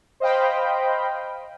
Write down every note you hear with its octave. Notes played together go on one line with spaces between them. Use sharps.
C5 D#5 F5 G5 B5